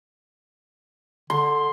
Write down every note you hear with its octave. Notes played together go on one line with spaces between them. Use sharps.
D3 C6